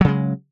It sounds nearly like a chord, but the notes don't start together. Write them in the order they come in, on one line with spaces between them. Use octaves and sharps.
F#3 C#3 G#3